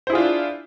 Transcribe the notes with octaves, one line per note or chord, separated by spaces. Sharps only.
D4 E4 F4 G#4 C5